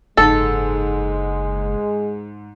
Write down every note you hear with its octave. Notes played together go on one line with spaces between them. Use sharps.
F#1 G#2 G#3 A4